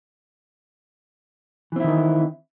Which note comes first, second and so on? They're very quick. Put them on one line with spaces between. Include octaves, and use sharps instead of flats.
E3 C4 E4 D#3